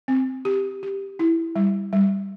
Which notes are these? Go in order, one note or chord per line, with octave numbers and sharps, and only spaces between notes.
C4
G4
G4
E4
G3
G3